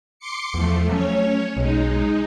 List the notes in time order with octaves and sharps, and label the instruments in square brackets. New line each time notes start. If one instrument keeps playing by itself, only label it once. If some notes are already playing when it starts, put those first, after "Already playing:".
[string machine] C6 D6 C#7
[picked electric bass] E2 [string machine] F3 A3
[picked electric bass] F#3 A3 [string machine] C#4 C#5
[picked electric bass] B1 [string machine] G#3 D#4